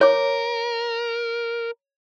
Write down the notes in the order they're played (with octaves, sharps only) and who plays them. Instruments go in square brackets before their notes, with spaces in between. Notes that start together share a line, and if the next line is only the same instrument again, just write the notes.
[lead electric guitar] A#4 [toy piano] C#5 D6